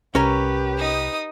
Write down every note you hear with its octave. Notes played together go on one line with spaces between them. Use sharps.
C2 C#4 G4 A#4 B4 C#5
D#4 D#6